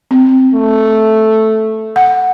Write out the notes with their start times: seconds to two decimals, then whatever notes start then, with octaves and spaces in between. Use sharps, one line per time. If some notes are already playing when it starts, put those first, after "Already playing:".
0.11 C4
0.54 A3
1.96 F#5